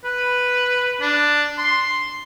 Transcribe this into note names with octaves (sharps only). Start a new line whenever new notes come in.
B4
D4
C6